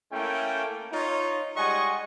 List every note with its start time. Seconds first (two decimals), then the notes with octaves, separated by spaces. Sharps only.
0.13 A3 A#3 C#4 E4 G5
0.92 D#4 F4 C#5
1.57 G3 G#3 D#5 F#5 G#5 C#6